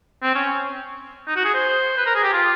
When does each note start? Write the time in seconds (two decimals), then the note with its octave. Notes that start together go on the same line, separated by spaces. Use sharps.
0.23 C4
0.35 C#4
1.28 D#4
1.36 F#4
1.45 G#4
1.54 C5
1.98 B4
2.06 A#4
2.15 G#4
2.23 G4
2.33 F4